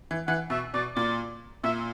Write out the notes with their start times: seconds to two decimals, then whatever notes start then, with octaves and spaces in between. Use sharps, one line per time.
0.11 E3
0.27 E3 F#5
0.50 B2 E5
0.74 B2 D5
0.95 A#2 D5
1.64 A#2 E5